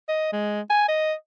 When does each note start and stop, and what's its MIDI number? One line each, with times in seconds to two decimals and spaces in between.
0.09 0.31 75
0.33 0.61 56
0.70 0.85 80
0.89 1.13 75